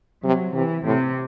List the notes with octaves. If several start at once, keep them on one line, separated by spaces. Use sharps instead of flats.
C3 F#3
C3 E3
A2 C3